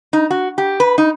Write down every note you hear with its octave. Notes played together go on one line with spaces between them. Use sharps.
D#4
F#4
G4
B4
D#4